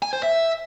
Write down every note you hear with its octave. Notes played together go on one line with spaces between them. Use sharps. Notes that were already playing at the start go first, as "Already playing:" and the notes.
G#5
C5
E5